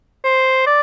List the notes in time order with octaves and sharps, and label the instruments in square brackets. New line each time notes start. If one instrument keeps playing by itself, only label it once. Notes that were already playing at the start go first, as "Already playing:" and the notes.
[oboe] C5
D5